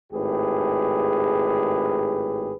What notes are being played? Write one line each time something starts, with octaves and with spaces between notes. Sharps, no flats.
G#1 A2 G4 G#4 B4